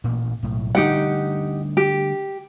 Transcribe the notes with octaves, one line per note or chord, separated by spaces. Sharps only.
A1 A#2 A#3
B1 A2
D3 G3 A3 D#4 G4 F#5
G4